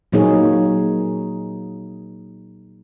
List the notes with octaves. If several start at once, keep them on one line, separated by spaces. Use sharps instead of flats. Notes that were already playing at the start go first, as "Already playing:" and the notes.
A#2 F#3 A#3 D#4 G#4 C#5